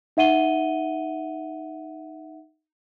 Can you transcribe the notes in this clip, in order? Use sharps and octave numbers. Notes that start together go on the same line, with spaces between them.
D#4 E5 F#5 D#7 G7